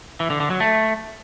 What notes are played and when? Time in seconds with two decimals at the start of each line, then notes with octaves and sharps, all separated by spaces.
0.20 E3
0.30 D3
0.40 D3
0.50 F#3
0.60 A3